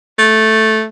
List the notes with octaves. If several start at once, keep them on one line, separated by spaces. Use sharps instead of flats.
A3